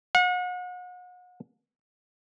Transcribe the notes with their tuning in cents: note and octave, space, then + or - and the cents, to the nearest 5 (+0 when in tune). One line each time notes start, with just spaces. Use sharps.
F#5 -40